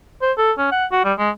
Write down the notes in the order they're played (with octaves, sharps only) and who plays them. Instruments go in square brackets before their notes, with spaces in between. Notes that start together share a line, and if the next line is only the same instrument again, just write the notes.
[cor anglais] C5
A4
C#4
F#5
F#4
G3
G#3